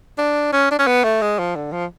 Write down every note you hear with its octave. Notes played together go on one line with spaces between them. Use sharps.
D4
C#4
D4
C#4
B3
A3
G#3
F3
D3
F3